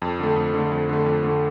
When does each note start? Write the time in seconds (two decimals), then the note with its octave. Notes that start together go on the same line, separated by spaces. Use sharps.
0.02 F2
0.20 D3 A3
0.36 F2
0.54 D3 A3
0.72 F2
0.89 D3 A3
1.06 F2
1.23 D3 A3